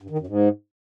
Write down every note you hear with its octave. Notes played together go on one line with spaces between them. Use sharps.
G2
D#3
F#2
G#2